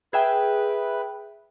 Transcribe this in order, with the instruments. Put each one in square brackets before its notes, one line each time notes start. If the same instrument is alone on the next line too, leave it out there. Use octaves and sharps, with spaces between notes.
[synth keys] G#4 E5 G5 [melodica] B4